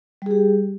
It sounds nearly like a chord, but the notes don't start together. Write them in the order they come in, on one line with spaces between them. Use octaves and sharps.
G3 G#4 G4